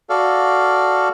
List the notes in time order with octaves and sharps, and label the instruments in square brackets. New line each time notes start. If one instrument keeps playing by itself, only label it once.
[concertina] F#4 A4 D5 F5